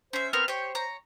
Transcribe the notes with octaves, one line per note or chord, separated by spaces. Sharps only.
C#4 C5 E5
B3 C4 A#4 F6
G4 C5 C#5
C#5 A#5